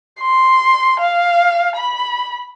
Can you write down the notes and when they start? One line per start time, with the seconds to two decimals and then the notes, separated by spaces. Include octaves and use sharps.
0.20 C6
1.00 F5
1.76 B5